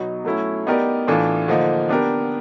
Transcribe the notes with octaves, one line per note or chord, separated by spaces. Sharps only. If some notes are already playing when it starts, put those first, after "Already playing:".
Already playing: B2 F#3 B3 D#4
F#3 A3 C#4 E4
B3 D#4 G4 A#4 D5
A2 E3 A3 D4 F4
D3 F3 A#3 D#4
B3 D4 G4 A#4